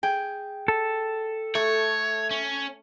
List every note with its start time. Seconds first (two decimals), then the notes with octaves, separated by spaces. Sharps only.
0.03 G#4 G5
0.68 A4
1.55 A3 C#5
2.31 C#4